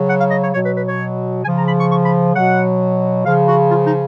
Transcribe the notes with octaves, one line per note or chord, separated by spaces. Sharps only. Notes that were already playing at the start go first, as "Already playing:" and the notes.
Already playing: C#3 F#3
F#5
F5
D#5
C#5
B2 F#3 C#5
B4
B4
C#5
C#3 F3 G#5
A#5
B5
C#6
C#6
B5
B2 F#3 F#5
C#3 F3 F5
F#4
F4
D#4